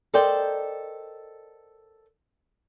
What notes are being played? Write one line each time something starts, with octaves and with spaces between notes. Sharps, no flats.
A4 A#4 C5 D5 D#5 G5